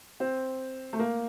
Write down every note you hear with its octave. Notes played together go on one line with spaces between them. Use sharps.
C4
A3
A#3